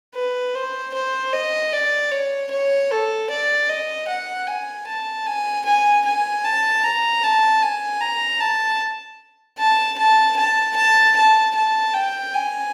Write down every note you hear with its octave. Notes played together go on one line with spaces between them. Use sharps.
B4
C5
C5
D#5
D5
C#5
C#5
A4
D5
D#5
F#5
G#5
A5
G#5
G#5
G#5
A5
A#5
A5
G#5
A#5
A5
A5
A5
A5
A5
A5
A5
G5
G#5